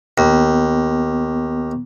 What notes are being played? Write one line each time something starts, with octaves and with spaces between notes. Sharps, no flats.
D#2 B3